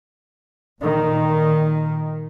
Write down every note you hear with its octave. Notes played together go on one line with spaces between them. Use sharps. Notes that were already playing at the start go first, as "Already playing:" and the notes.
A#2 D#3